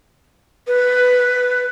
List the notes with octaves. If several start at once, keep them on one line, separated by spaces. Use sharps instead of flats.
B4